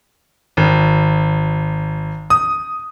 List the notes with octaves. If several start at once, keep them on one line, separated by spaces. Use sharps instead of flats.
G#1
D#6